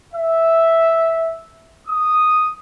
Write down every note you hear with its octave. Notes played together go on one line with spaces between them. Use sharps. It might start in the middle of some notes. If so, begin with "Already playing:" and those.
E5
D#6